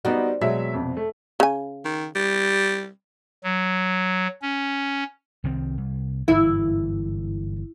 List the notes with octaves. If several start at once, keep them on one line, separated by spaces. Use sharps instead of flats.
G3 B3 C4 D#4 F#4
B2 F#3 G#3 E5
F2 C3
A3
C#3 G#5
D#3
G3
F#3
C#4
C2 D#3 C4
C2
G1 G#2 E3 E4